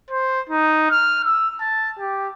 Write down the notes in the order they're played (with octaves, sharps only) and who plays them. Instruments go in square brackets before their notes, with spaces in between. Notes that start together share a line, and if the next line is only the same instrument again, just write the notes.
[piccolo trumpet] C5
D#4
F6
E6
A5
G4